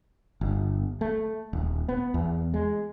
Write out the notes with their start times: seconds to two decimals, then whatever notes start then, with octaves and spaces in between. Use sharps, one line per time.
0.41 G1
1.01 A3
1.53 D#1
1.88 B3
2.14 E2
2.54 G#3